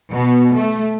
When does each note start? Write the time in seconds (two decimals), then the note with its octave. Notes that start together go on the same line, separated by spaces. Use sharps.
0.11 B2
0.55 A3